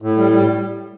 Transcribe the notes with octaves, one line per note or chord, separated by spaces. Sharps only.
A2
G3
G3